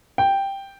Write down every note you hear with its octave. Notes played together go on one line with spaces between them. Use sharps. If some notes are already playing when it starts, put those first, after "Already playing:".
G5